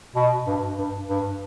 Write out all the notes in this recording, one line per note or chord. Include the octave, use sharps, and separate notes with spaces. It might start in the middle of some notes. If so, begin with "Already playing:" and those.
B2
G2
G2
G2